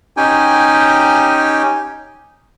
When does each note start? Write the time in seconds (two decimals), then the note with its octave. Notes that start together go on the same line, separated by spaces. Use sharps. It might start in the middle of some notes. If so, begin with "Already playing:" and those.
0.17 C#4 D#4 G4 G5 G#5